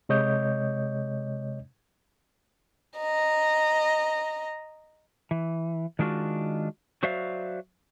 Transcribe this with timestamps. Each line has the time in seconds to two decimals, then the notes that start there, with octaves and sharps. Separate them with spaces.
0.09 C3 G#3 C#5 D#5 G6
2.97 D#5 A#5
5.31 E3
5.99 D#3 G#3 D4 F4 F#4
7.03 F#3 F#4 C5 D5 E5 F5